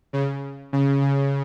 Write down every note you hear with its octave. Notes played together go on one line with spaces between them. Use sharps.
C#3
C#3
C#3